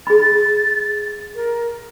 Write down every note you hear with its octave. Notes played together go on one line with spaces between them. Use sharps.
G#4 B5 A6
A#4